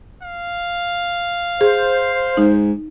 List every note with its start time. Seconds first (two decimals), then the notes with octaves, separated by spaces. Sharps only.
0.23 F5
1.61 G#4 C5
2.37 G#2 D#4